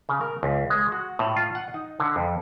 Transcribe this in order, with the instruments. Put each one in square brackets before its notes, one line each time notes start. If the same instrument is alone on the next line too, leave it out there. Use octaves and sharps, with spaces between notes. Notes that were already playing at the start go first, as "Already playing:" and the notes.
[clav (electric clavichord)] C#3
A#4
C#2
G#3
F#4
A2
F4
F#5
D#4
D3
F2